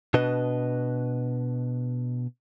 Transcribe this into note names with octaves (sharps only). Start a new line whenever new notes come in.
B2 D4 B4 D#5